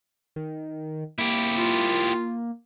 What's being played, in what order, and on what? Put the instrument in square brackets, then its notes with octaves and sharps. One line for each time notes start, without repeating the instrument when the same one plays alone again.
[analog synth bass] D#3
[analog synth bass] A#3 [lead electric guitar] E4 G4
[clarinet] F4